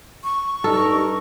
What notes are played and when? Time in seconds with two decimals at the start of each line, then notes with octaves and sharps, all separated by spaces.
0.24 C#6
0.64 G2 D#4 A4 A#4